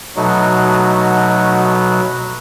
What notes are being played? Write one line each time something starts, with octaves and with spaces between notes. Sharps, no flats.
B2 F#3 A3 D#4 F#4